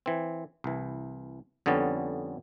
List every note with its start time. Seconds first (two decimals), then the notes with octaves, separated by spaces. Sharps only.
0.06 E3 C4
0.64 C2 E3
1.66 F2 D3 G3 B3 C#4